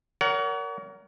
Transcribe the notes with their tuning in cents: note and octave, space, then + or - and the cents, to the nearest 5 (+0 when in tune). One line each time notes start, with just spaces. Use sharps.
A#4 +0 C#5 +40 F#5 +20